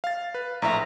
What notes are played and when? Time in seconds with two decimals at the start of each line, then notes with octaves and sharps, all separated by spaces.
0.04 F5 A6
0.34 B4
0.62 A#1 A2 E5 A#5